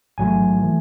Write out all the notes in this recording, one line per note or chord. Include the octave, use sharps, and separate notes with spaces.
A1 G#2 F#3 A3 G#5
E3 A3